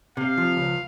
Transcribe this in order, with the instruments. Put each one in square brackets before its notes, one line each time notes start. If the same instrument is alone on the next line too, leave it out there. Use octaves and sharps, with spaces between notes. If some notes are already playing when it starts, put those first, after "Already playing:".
[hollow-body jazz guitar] C3 [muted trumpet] F5
[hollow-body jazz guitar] F3
C#2